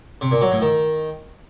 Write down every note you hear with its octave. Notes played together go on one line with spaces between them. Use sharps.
C3
A#2
F#3
A2
D#3